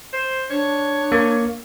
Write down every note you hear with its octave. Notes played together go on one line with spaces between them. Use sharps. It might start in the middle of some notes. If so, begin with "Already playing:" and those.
C5
D4 C#5
A#3